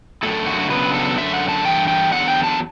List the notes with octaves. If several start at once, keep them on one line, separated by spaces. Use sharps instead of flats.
F#2 D3 A3 E4 A4
F#4
C#3 F#3 B3 D4 B4
A4
F#2 D3 A3 E5
F#5
A5
G2 E3 A3 G5
G5
E2 D3 F#3 F#5
G5
A5